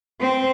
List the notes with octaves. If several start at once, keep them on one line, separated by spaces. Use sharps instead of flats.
C4